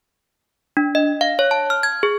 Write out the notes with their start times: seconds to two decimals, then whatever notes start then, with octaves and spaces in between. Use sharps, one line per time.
0.77 D4
0.95 D#5
1.21 F5
1.39 C#5
1.51 A5
1.70 F6
1.83 G#6
2.03 G#4